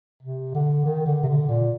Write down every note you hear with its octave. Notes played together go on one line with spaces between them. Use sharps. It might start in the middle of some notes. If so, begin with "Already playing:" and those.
C3
D3
D#3
D3
C3
D3
A#2